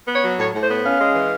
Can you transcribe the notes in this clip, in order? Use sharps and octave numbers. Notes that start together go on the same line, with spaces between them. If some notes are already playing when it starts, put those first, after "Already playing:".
B3
C#5
F#3
A2 C#5
A2
C5
B3
C#4 F5
G#3
E3